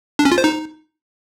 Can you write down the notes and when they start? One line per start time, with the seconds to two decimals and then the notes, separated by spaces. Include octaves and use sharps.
0.19 D4
0.25 C#4
0.32 F4
0.38 C5
0.44 D#4